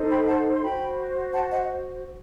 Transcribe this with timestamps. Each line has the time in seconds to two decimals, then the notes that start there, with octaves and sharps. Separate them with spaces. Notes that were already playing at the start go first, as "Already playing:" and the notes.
Already playing: D#4 A4 C5
0.10 G5 B5
0.27 F#5 A5
0.54 C6
0.62 F#4 C5 G5 B5
1.33 F#5 A5
1.50 D#5 F#5